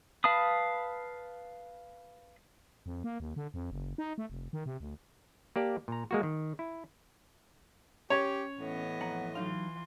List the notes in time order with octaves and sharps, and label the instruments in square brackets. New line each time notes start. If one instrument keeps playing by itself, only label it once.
[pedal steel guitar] B4 F5 A5 B5 D#6
[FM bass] F2
A#3
D#2
D3
F2
F#1
D#4
A3
F1
D#3
C3
D2
[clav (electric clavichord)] A#3 G4 D5 A5
A#2 A#5
G#3 A#3 F#4
D#3
E4
[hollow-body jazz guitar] C#4 [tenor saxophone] G4 [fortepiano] C#5
[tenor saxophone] A2 [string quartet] E3 B3 D#5
[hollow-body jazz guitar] F2 F#5 A#5
[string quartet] E3 F4 [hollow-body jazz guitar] F#3 D#4 F5